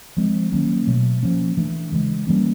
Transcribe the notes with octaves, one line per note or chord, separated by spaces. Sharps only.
F3 G#3 C4
D#3 F#3 A#3 C#4
B2 F#3 A3
F3 A#3 C#4
E3 A3 D4
C#3 E3 G#3
E3 G3 A#3 C#4